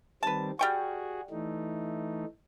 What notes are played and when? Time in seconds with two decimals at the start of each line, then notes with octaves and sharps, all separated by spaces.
0.23 D#3 G3 C4 B4 A5
0.59 G3 F#4 G#4 G5 C#6
1.30 E3 A3 D#4